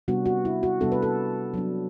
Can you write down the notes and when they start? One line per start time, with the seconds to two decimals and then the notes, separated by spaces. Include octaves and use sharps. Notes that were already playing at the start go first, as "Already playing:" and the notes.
0.08 C3 G3 B3 D4 F#4
0.26 F#4
0.45 E4
0.63 F#4
0.80 C3 G3 B3 D4 A4
0.92 B4
1.03 A4
1.54 F#3 B3 D4